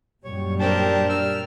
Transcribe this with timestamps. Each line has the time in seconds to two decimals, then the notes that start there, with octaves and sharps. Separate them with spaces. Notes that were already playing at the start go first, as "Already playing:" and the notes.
0.24 F#2 A#2 G3 C#5
0.59 C4 D4 G4 A#4 A5
1.09 E6 F6